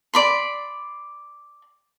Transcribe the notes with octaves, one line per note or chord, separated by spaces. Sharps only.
D5 B5 C6